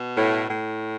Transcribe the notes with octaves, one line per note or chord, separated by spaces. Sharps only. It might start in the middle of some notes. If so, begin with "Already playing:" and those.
Already playing: B2
A2
A2